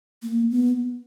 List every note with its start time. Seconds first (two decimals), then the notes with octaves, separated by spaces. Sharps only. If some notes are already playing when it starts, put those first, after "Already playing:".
0.23 A#3
0.51 B3